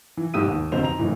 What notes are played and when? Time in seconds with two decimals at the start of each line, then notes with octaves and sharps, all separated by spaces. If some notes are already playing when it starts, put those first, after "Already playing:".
0.17 E3
0.34 G1 G#2 G4 D#6 E6 D#7
0.48 D#2
0.72 F1 B1 F2 D3 C5 F7
0.83 A#5 F7
0.98 F#1 A2 E3